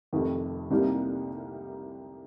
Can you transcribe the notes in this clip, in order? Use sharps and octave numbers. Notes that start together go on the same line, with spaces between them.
F1 F2 C3 D#3
C2 C3 G3 A#3 D#4